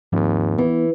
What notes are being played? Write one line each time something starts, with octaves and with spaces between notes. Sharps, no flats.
D#2 G#2 F3 C4
E3 B3